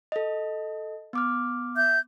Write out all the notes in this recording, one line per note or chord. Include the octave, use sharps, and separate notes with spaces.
A4 D#5
B3 D6 F6
E5 G6